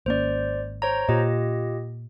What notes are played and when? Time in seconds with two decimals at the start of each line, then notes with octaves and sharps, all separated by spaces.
0.06 G#1 A#3 C#4 C5 D5
0.82 C5 C#5 A#5
1.09 A#2 F4 G4 D#5